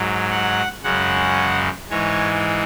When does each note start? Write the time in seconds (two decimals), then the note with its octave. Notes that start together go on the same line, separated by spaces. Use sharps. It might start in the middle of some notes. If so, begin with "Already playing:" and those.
Already playing: G#2 F#3
0.31 F#5
0.83 F#2 C#3 G#3 F#5
1.90 G#2 E3 G#3 C#5